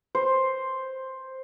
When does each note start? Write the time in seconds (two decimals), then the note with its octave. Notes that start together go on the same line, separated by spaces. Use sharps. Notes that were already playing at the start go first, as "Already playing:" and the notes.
0.15 C5